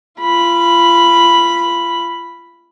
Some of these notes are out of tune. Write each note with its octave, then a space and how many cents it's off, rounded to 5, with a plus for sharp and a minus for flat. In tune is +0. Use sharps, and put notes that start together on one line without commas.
F4 -30 B5 +0